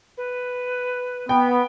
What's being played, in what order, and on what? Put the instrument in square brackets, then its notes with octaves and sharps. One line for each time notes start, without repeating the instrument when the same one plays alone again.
[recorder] B4
[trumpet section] B3 [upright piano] G5